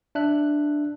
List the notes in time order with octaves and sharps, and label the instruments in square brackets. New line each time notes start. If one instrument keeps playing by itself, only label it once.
[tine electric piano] D4 E5 F#6